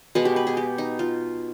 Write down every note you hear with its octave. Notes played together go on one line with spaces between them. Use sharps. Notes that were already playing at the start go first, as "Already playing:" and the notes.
B2 G#3 B3 B4
G4
B4
G#4
G4
D#4
F4